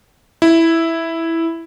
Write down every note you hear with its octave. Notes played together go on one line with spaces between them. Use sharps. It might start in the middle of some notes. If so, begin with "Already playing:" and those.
E4